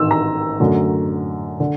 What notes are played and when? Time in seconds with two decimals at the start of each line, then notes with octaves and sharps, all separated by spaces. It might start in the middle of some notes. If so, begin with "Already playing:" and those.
Already playing: A1 G#2 D#3 E6
0.11 A#5
0.60 F#2 D3 F#3 A3
1.60 D3